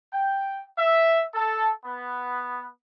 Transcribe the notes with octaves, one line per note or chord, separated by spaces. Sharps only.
G5
E5
A4
B3